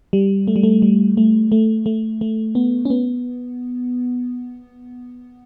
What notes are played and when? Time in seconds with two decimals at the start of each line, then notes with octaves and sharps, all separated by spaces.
0.13 G3
0.47 A3
0.56 G3
0.63 A3
0.82 G3
1.17 A3
1.52 A3
1.86 A3
2.21 A3
2.55 B3
2.85 C#4
2.90 B3